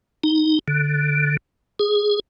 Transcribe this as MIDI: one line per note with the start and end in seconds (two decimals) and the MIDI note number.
0.24 0.59 63
0.68 1.37 50
1.79 2.20 68